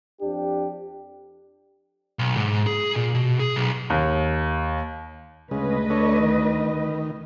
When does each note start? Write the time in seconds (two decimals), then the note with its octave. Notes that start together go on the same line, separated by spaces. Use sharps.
0.21 F2 D4 G4
2.19 B1
2.37 G#2
2.67 G#4
2.96 A#2
3.15 B2
3.40 G#4
3.57 B1
3.90 D#2
5.51 D2 C#3 G#3 B4 D#5
5.90 D4 A4 C#5
6.20 D#3